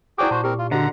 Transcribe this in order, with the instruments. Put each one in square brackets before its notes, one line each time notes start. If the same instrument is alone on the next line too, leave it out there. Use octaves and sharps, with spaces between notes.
[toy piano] E4 D5 D6 [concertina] F#4 G#4 G5
[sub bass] A#2 [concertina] F#4 C5 [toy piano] A5 C#6
[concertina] C4 A#4 [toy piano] G4
[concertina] F4
[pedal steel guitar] D3 [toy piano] F#4 D#5 [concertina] F#5 A#5